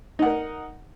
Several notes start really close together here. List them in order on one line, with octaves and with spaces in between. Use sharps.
D#4 F#5 A#4